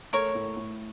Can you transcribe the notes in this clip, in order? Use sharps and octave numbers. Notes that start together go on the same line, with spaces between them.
A3 A#4 C#5
A2
A2